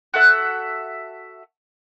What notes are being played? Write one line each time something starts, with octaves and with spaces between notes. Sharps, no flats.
F#4 A4 E5 F#5